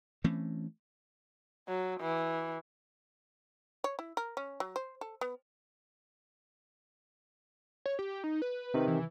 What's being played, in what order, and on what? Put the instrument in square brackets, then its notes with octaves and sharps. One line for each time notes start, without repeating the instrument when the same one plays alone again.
[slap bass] E3 A3 C4 C#4
[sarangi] F#3
E3
[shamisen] C#5
E4
A#4
C#4
F#3
C5
A4
B3
[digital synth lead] C#5
G4
D#4
B4
[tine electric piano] C3 D#3
[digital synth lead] E3